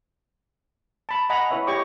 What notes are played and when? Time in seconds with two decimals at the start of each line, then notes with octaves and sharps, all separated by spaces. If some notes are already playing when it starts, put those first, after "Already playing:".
1.09 A5 B5
1.29 D#5 F#5 G#5 A#5 B5
1.51 E4 B4 C#5 E5
1.67 G4 C#5 D#5 G5 C#6 D6